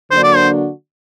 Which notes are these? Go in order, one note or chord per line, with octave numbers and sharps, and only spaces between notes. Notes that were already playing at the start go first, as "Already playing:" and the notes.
D3 F#3 A#3 D4 F#4 C5
D5
C5